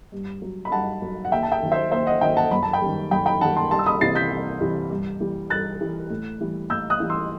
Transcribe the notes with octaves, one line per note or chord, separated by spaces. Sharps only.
G2
F#3
B5
G2 F#5 A5
F#3
F#5
D#2 E5 G5
A5
E5 G5
D#3 F#3
C5 E5
D#2 C5 E5
D#5 F#5
D#3 F#3 E5 G5
F#5 A5
F#2 B5
A5
G5 B5
D#3 G3
F#2 G5 B5
G5 B5
D#3 G3 F#5 A5
A5 C6
C2 A5 C6
E6
B5 D#6
C3 E3 G3 A6 C7
G6 B6
C2
C3 E3 G3
G2
E3 G3
G2 F#6 A6
E3 G3
A2
E3 G3
A2 E6 G6
D#6 F#6
E3 G3
C6 E6